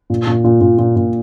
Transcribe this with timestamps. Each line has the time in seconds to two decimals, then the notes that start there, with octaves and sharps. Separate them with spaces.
0.10 A#2
0.27 A#2
0.44 A#2
0.61 A#2
0.79 A#2
0.96 A#2